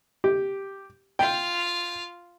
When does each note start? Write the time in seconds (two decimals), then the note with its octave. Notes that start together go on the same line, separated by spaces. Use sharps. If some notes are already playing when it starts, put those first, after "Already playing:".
0.24 G4
1.19 F4 F5 G5